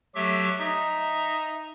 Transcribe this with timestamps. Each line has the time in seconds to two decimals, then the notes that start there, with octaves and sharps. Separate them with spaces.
0.15 F#3 A3 G4 E5
0.60 D#4 E5